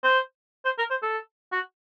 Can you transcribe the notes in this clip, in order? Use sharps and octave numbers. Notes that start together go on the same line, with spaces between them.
C5
C5
A#4
C5
A4
F#4